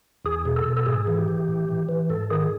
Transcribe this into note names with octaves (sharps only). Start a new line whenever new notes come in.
E2 G#4
B2
A4
B2
A4
G#2 G#4
E3
G4
E3
A2
E3
E3
G#2 A4
D#3 G#4